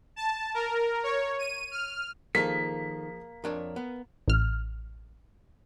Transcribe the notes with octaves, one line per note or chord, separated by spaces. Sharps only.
A5
A#4
C#5
D#7
F6
D#3 F3 A#3 G#4 A4 B6
F2 D4 A#4 C#5
B3
A1 F6